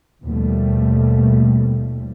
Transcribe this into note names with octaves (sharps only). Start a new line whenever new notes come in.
D#2 B2 F3 G3 A3